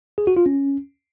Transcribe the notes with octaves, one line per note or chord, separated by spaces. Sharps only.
G#4
F#4
F4
C#4